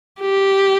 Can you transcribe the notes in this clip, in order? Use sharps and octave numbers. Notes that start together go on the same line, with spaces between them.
G4